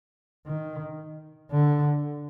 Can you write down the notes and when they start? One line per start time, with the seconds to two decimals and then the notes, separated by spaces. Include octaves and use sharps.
0.46 D#3
1.51 D3